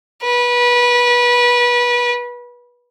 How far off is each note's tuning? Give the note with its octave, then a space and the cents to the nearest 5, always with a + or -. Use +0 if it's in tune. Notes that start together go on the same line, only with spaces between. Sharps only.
B4 -25